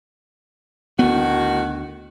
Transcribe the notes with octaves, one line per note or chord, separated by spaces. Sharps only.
D2 A2 D#3 B3 F#4